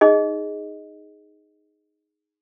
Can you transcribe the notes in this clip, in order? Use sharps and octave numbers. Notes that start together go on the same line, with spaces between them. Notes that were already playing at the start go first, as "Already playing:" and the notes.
D#4 G#4 D#5